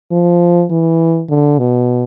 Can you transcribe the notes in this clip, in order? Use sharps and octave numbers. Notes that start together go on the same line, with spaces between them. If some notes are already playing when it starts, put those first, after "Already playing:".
F3
E3
D3
B2